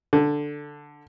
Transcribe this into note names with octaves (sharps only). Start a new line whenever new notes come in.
D3